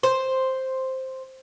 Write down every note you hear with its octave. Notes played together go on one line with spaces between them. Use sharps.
C5